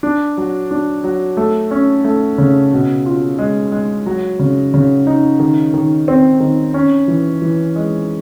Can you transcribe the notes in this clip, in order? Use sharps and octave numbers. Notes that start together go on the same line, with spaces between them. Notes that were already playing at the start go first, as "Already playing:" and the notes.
D4
F#3
D4
F#3
A3
C#4
A3
C#3
B2
F4
G#3
G#3
F#3
C#3
C#3
D#4
D#3
D#3
C4
D#3
C#4
E3
E3
G#3